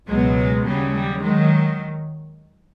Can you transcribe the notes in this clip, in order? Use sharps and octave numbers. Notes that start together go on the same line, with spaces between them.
C#2 B2 F#3 G#3
G#3
D#2 C#3 F#3 G3
G3
D#3 F#3 G#3